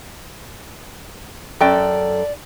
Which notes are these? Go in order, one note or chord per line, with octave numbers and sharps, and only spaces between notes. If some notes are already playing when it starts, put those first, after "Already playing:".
F#2 A4 D5 G5